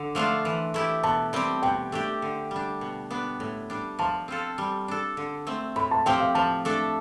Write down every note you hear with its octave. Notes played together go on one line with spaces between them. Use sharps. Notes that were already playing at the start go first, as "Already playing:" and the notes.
Already playing: D3
F3 A3 D4 F4
E3
A3 E4 G4
B2 A5
G3 C4 G4
B2 G5
A3 D4 G4
D3
G3 D4
B2
B3 D4
A2
G3 D4
F3 A5
C4 F4 A4
G3
D4 A4
D3
A3 C4
A2 B5
A5
F3 C4 G4 G5
F5
F3 A5
A3 D4 A4